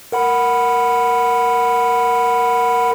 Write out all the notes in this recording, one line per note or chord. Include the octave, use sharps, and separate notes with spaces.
A#4 F#5 B5